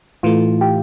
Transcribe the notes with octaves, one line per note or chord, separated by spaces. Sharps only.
A2 E3 A3 F4
G4